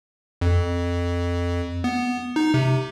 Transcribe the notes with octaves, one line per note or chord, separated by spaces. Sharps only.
F2
B3
D#4
C3